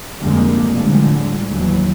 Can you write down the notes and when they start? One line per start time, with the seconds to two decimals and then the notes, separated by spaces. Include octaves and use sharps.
0.18 F1 F2 D3 G3 G#3 A#3
0.72 A2 D3 F3 G3 G#3
1.48 D#2 E3 F#3